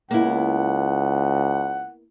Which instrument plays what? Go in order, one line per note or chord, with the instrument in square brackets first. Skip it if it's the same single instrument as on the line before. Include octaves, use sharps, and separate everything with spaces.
[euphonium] C#2 [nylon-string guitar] A#3 B3 E4 [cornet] F#5